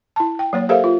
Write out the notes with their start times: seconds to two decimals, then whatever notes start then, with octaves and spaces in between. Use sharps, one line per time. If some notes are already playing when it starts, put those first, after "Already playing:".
0.16 E4 A5
0.39 G5
0.53 F#3 A#3 C#5
0.69 G4 A4 A#4 C5 E5 F5
0.84 F4